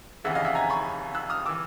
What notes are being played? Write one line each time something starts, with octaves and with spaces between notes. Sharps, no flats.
F1 D#2 C#3 E3 E5 F#5
D#5 F5
E5 F#5
G#5 A#5
B5 C#6
E6 F#6
D#6 F6
D6 E6
E3